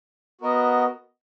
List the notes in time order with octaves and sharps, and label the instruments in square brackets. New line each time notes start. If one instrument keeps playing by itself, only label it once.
[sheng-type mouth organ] B3 F#4 A#4 D#5